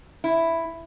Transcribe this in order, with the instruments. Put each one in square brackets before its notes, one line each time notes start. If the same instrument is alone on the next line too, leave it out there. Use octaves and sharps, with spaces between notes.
[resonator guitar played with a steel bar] E4